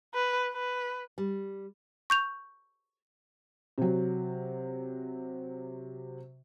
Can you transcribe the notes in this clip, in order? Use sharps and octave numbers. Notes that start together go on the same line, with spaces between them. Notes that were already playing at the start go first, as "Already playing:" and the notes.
B4
B4
G3
C#6 G6 F7
C3 F#3